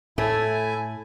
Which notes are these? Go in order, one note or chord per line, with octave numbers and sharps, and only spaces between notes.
A2 A3 E4 G#5